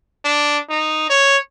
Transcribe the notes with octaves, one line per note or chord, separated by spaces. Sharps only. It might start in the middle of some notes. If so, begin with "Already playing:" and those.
D4
D#4
C#5